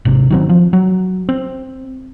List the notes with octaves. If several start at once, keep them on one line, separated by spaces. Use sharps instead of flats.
G#1 C3
D#3 F#3 C4
F3
F#3
C4